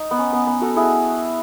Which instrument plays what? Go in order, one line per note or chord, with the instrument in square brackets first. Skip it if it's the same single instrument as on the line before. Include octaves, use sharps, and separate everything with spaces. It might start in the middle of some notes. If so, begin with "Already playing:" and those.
Already playing: [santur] D#4
B3
C#4
B3
B3
F#4 A4
E4 G#4